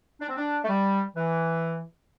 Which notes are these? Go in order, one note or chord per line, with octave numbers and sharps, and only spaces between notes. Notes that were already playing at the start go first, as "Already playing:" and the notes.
D4
C4
D4
A3
G3
E3